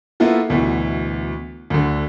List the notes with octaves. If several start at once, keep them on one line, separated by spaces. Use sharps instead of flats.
A#3 B3 E4 F4 A4
D2 B2 E3
D2 D3